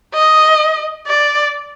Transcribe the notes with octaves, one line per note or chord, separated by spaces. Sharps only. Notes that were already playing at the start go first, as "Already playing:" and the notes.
D#5
D5